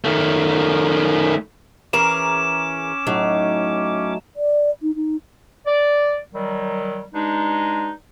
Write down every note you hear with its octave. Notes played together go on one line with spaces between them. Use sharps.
D#3 A3
E3 C#4 G#4 A#4 D6 E7
A2 F#3 D#4 A4
D5
D#4
D#4
D5
D#3 F#3 G3
G2 G#3 D4 D#4